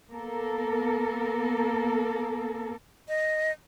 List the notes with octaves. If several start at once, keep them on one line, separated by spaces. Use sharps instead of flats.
A#3 B3 A4 A#4
D#5